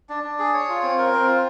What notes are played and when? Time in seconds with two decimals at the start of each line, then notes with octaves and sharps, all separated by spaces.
0.09 D4
0.24 D4
0.39 G#4
0.54 C#5
0.69 F4
0.83 C4
0.98 A#4
1.13 C4
1.27 F4